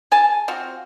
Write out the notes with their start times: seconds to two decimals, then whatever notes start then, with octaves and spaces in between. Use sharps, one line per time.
0.11 G#4 G#5 A5
0.48 C4 F4 F#4